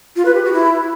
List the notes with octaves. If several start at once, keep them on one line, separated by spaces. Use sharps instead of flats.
F4
B4
G4
F#4
E4